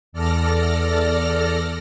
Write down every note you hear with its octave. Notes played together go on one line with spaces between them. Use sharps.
E2 A4 D5 F6 A#6